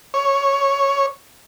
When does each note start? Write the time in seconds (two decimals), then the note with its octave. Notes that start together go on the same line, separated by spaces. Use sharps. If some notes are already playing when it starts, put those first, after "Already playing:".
0.14 C#5